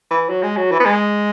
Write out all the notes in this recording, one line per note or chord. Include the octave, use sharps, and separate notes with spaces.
E3
F#3
G#3
F#3
E3
B3
G#3